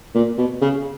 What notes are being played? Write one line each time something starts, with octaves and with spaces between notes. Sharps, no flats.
A#2
B2
C#3